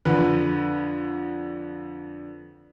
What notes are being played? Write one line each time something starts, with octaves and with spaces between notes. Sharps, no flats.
F2 D3 B4